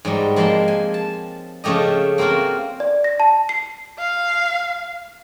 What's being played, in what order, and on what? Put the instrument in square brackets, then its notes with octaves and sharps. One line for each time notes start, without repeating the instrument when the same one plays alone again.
[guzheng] G#2 F#3 G3
F3 G#3 A#3 C4 A5 C6
G#5
A5
C#3 F3 A3 G4 D#5
A#3 C4 F4 F#4 A#4
[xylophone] D5
A#6
A5
C7
[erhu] F5